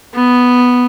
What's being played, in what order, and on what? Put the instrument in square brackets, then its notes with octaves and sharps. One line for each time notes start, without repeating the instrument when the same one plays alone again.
[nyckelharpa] B3